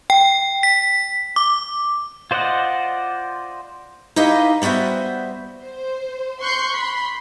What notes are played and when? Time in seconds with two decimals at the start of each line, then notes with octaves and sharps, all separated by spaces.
0.10 G5
0.63 B6
1.36 D6
2.31 F4 C5 D5 D#5 F#5
4.16 D#4 E4 G4 B4 D#5 F5
4.62 G3 B3 F#4 C5 E5
5.61 C5
6.41 C6 C#6 F#6 G6 C7
6.72 B5 C6